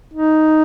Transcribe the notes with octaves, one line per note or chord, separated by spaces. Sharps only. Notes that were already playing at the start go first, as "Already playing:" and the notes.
D#4